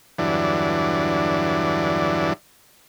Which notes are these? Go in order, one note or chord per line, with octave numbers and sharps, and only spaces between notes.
E2 G2 D3 E3 F#3 D4